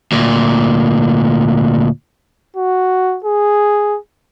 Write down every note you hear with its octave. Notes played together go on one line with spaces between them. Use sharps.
D2 A#2
F#4
G#4